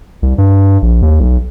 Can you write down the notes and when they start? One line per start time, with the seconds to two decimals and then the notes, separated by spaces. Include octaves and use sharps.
0.22 C2
0.38 G2
0.82 A#1
1.02 D#2
1.20 B1